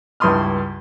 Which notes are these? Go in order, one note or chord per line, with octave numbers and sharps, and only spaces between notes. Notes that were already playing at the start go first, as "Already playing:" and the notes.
C#2 G2 E4 C6 D#6 F6